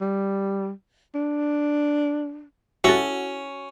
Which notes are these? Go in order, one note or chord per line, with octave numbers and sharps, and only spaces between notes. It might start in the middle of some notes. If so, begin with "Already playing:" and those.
G3
D4
C#4 E4 F#4 G4 A4